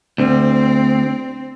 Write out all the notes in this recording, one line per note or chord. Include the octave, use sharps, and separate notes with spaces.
D2 C4